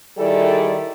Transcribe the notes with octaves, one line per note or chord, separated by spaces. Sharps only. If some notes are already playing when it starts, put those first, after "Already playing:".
D#3 G3 E4 G#4 A4 D5